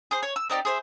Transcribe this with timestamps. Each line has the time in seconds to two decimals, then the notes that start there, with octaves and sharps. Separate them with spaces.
0.11 G#4 C5
0.23 C#5
0.36 E6
0.50 C4 D#4 G4 D5
0.65 G#4 C5 E5